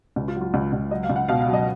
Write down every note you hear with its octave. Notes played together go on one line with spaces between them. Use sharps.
C#2
F4
F#3
F4
C#2
C#2
F#3 D#5
F5
C#2
F#5
B2 F5
F5
F#3
D#5